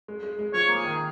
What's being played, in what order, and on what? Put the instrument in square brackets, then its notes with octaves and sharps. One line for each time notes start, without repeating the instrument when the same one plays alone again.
[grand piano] G#3
G#3
G#3
[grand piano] F3 [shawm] C#5
[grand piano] A#3
[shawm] G#4
[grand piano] D#3